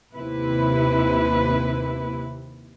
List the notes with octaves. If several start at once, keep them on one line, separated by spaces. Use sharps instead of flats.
D#2 C3 E4 B4